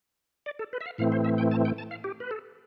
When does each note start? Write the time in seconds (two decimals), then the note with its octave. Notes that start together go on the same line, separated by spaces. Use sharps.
0.46 D5
0.59 A4
0.73 B4
0.81 E5
0.86 F5
0.98 A2 E3 A3 C4 F5
1.12 C5
1.24 E5
1.38 G5
1.51 A5
1.65 G5
1.78 A5
1.91 F5
2.04 G4
2.20 B4
2.31 A4